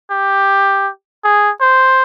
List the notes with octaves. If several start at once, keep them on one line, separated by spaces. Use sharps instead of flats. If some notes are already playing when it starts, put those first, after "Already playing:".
G4
G#4
C5